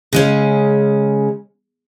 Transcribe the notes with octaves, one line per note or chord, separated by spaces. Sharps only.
C#3 G#3 C#4